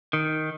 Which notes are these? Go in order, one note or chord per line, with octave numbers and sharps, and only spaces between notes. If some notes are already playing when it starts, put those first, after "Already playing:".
D#3